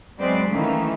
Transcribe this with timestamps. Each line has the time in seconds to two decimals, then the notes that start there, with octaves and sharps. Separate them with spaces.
0.19 F#3 G#3 C4 B4 C5 D5
0.48 D#3 E3 A3 A#3 C#4